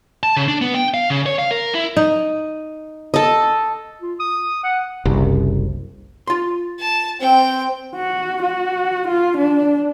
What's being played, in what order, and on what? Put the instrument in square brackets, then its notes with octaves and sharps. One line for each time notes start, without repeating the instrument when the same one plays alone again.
[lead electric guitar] A5
C#3
D4
B3
G5
F5
C#3
C#5
F5
A#4
E4
[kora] D#4
[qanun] A4 D#5
[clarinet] F4
D#6
F#5
[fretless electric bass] F#1 C2
[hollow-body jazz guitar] F4 C6
[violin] A5
[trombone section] C4 [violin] G5
[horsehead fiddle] F#4
F#4
F4
D4